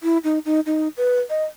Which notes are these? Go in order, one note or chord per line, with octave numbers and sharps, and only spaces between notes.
E4
D#4
D#4
D#4
B4
D#5